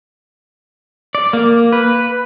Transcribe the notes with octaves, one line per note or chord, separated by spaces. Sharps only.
D5
A#3
B4